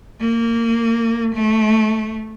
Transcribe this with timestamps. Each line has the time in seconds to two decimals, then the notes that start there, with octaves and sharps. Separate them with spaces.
0.21 A#3
1.35 A3